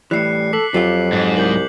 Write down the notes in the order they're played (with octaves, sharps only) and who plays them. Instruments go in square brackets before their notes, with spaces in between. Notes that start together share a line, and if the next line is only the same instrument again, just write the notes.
[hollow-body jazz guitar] A2 E3 [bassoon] G3 [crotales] F#6 C7 C#7
[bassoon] A4 [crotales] D6 B6 F#7
[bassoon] F2 [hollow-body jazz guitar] F#3 F4 G4 [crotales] C7
[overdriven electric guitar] G#2
[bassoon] C2 [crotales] D6 G6 F#7